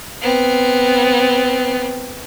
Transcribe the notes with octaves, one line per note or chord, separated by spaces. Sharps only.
B3 C4